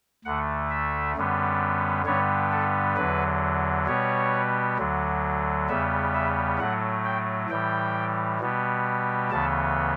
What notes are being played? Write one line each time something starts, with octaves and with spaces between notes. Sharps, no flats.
D2 D3 A3 F#5
E5
F#2 D3 G3 B3
G2 D3 G3 B3 C#5
A4
E2 D3 F#3 B4
B2 G3 B3 C#5
D2 D3 F#3
E2 C#3 G3 B3 E5
E5
A2 F#3 A3 F#5
G5
A2 E3 G3 G5
B2 G3 B3
D2 C#3 E3 B3 A5